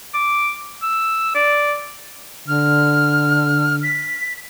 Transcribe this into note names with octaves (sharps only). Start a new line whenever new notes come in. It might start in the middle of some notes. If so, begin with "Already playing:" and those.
D6
E6
D5
D3 F6
B6